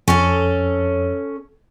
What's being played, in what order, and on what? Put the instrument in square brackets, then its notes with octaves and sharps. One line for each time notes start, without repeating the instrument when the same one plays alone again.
[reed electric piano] F2 [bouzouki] C#4 A4